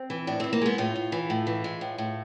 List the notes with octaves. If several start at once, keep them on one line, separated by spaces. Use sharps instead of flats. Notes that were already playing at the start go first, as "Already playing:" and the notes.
Already playing: C4
E3
A2 D4
E3 C4
A#3
G#3 B3
A2 F4
A2
E3
A2
E3
G#3
A2
A2